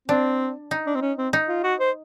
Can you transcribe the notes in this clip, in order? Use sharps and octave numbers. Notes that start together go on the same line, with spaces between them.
C4 D4
D#4
D4
C4
C#4
C4
D#4
F4
F#4
C5